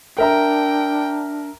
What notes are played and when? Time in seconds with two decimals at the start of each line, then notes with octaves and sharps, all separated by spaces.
0.18 D4 A#4 E5 G5 A#5